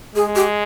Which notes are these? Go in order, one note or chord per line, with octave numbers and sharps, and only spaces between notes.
G#3 G#4
G4